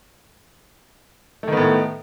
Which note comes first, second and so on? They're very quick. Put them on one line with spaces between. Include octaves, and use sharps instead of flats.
A3 D#3 B3 A2